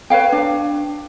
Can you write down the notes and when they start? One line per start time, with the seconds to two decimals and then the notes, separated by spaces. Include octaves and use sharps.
0.10 B4 C#5 F5 G5
0.32 D4